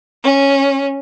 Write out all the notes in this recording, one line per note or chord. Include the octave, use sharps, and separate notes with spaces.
C#4